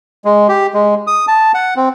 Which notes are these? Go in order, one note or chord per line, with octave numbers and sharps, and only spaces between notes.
G#3
G4
G#3
D#6
A5
F#5
C4